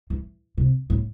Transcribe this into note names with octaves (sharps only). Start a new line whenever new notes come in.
E3
C3
A2